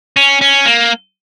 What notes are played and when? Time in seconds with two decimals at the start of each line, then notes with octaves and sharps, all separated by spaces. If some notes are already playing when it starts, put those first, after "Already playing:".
0.17 C#4
0.41 C#4
0.66 A#3